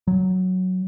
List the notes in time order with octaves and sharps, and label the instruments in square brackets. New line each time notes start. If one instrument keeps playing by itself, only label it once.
[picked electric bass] F#3